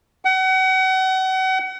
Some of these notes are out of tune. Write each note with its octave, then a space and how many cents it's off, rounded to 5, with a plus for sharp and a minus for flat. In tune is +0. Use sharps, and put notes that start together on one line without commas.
F#5 +35